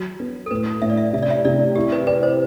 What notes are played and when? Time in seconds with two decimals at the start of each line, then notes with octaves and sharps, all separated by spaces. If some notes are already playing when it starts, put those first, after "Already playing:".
Already playing: F#3
0.20 B3
0.46 A4
0.51 A2 B4
0.82 A2 E5
0.90 D5
0.97 E5
1.13 C3 E5
1.23 D5
1.31 E5
1.45 C3 D5
1.75 E4 G4
1.92 B4
2.07 B4 D5
2.23 C5